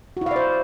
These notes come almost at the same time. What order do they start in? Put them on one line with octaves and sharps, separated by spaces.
F#4 E4 F5 D5 C5